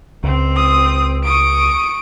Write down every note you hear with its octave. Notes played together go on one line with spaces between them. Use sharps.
C#2 C4
D#6
C#6 D#6 D7